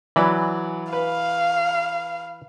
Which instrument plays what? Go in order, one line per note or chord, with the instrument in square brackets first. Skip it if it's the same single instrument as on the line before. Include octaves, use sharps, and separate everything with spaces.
[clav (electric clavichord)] E3 [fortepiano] F#3 D5 B5
[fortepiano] B4 [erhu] F5